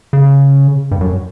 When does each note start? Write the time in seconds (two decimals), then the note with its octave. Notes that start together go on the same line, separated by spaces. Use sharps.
0.13 C#3
0.91 G2
1.01 F#2